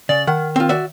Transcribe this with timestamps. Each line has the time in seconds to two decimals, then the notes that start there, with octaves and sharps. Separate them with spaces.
0.09 C#3 D5
0.27 D#3 F#5
0.56 C4 F4
0.69 F#4 D5 E5